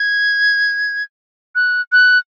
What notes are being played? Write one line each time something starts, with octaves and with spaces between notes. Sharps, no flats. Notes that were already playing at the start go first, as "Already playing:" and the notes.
Already playing: G#6
F#6
F#6